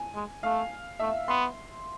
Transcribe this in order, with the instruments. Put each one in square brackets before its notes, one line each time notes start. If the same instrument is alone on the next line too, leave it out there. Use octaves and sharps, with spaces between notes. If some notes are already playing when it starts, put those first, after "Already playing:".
Already playing: [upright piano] G#5
[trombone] G#3
[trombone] A3 [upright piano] F5
[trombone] A3 [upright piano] E5
[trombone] B3 [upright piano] C6